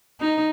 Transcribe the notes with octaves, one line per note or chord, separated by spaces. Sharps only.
D#4